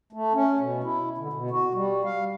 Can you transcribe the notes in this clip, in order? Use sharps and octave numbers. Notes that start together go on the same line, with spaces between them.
A3
C#4
B2
E4
D3
B2
F#4
G3
F5